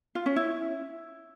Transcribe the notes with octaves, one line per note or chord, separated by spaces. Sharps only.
F4
C#4
E4